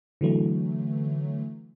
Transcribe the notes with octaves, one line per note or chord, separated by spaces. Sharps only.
D3 E3 F#3 A3